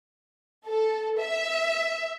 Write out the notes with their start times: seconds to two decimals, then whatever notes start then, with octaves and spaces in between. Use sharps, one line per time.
0.67 A4
1.19 E5